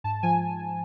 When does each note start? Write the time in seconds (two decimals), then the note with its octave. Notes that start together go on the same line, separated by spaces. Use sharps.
0.04 G#2 A5
0.23 F3 G#5